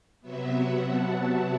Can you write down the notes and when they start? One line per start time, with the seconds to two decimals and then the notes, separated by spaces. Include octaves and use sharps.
0.21 C3 F#3 B3 E5
0.52 F#5
0.84 A5